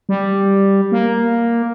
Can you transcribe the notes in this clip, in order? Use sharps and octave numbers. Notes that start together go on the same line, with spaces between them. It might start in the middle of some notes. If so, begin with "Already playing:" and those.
G3
A#3